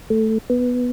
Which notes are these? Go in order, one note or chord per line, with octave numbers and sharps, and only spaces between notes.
A3
B3